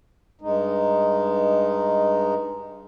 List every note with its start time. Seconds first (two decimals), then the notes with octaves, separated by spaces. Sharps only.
0.41 G2 G#3 D#4